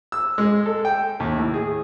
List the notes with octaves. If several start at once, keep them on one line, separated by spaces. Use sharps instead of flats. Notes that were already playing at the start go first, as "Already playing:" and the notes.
E6
G#3
A4
G5
D#2
A2
G#4